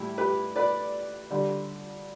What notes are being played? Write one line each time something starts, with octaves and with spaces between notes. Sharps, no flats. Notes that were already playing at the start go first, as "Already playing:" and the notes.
Already playing: A2 E3 G3 E4 G4
G4 B4
B4 D5
D3 G3